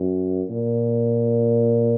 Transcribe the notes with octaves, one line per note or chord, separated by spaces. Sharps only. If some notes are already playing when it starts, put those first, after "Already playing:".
Already playing: F#2
A#2